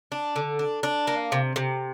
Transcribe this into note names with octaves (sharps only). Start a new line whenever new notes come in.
D4
D3
D4
D4
A#3
C3
C3